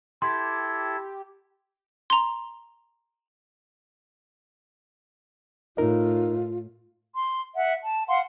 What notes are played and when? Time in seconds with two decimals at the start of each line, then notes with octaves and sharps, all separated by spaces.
0.22 E4 G4 A4 C6 G#6
2.10 A#5 C6
5.77 A2 D#4 F4 A#4 D#5
7.16 C6
7.55 E5 F#5
7.84 A5
8.07 F5 F#5 C6